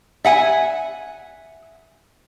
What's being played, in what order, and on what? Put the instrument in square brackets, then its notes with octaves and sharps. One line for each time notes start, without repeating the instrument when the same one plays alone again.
[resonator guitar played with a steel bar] E5 F#5 G#5